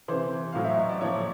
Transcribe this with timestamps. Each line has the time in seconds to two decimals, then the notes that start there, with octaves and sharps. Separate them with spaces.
0.08 C3 E3 C5
0.52 A2 F#3 F5
0.65 E5
0.77 D#5
0.89 D5
1.01 A#2 F3 C#5